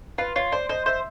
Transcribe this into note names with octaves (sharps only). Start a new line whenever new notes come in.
F4 B4
F4 C#5
C5 D5
C5 D#5
C5 E5